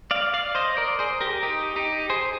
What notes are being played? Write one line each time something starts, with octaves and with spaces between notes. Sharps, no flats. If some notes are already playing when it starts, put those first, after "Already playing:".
D5 F5
D5 F5
C5 D#5
A#4 D5
G#4 C5
G4 A#4
D#4 G4
D#4 G4
G#4 C5